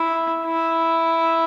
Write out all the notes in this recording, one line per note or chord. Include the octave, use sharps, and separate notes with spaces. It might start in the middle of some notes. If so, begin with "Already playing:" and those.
Already playing: E4
E4